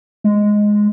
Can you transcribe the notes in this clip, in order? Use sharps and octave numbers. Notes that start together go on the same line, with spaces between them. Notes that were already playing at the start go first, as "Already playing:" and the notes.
G#3